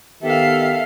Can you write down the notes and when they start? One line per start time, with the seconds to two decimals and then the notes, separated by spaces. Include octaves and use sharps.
0.22 D#3 B3 G4 A4 E5 F5